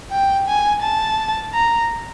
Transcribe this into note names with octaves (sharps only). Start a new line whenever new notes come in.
G5
G#5
A5
A#5